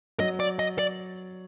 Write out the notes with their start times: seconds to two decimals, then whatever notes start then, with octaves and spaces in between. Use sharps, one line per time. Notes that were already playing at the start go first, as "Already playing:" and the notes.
0.19 F#3 D#5
0.40 D5
0.59 D#5
0.79 D5